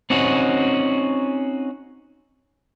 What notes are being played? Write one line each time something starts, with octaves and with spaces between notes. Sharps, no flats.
C4 C#4 D#4 F#4